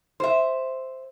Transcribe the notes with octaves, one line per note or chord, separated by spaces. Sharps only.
C5 E5